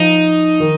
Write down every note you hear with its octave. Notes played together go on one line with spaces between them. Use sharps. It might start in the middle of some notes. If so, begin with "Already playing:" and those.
Already playing: F3 D#4
D#3